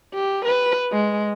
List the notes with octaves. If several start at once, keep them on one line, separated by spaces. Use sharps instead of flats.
G4
B4
G#3